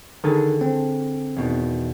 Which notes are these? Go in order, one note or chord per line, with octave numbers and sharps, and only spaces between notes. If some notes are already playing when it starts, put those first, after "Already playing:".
D3 D#3 G#4 A4
C4
E2 B2 D#3